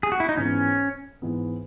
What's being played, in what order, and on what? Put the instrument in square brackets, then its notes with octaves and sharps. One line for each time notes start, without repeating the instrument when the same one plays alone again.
[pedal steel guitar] G#4
F#4
E4
D#4
[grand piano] G#2 E3 B3 [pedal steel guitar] C#4
[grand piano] G#2 E3 B3